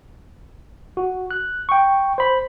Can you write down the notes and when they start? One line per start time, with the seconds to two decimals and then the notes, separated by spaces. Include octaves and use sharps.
0.97 F#4
1.31 F#6
1.69 G5 C#6
2.18 C5 B5